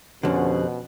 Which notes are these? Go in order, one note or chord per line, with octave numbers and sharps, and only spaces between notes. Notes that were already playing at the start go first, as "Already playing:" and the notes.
F2 B2 D3 C#4 G4 C5 F#5